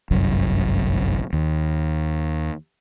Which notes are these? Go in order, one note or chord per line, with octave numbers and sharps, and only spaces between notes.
G1 C2 F#2
D#2